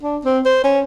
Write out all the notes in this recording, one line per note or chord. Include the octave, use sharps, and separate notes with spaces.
D4
C4
C5
C#4